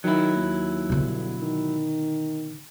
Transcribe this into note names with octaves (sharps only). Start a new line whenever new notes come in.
D#3 F#3 E4
D#2
G1 B2 D3
D#3